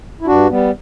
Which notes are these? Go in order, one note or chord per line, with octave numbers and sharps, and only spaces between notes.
E4
G2 D4 F#4
G3 B3